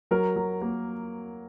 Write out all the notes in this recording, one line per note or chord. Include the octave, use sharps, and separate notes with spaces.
F#3 A#4
F#3
A#3